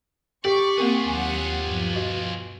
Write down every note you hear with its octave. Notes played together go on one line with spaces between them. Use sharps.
G4 D5 C#6
A#3 C4 F4 G#4 A#4
D#2 F#3 F#5 G#5
G2 B2 F3
F#4 D#5